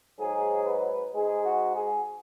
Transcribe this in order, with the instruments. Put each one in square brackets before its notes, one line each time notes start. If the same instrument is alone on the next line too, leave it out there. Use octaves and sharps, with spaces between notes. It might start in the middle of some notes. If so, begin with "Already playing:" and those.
[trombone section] G#2 F#3 G#4
B4
G#2 G#3 G#4
F#4
G#4